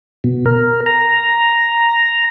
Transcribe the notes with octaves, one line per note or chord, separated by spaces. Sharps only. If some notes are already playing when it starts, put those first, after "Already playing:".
B2
A#4
A#5